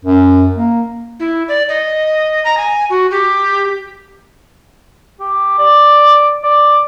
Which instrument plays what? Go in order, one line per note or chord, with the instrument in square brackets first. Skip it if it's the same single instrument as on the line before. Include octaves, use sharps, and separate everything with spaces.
[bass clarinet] F#2
A#3
[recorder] E4
D5
D#5
A#5
G#5
F#4
G4
[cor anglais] G4
D5
D5